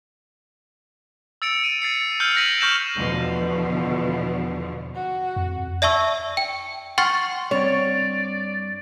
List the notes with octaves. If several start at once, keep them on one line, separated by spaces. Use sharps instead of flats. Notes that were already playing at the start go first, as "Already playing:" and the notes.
E6 A6 C#7 D7 F7
D#7
A6 C7 C#7
E6 F6 G6 C#7 D#7 F7
A#6 B6 D7 D#7 F#7
C#6 F6 G6 A#6 E7 F7
E2 B2 D3 F3
F#4
F2
D5 E5 A5 C#6 E6
G5
F#5 G5 C6 C#6 F6 A6
G2 C4 C#5 D5